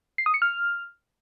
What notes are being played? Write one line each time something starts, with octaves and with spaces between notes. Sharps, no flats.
C7
D#6
C#7
F6